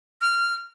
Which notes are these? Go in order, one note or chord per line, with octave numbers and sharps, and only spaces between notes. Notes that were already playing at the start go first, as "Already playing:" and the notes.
F6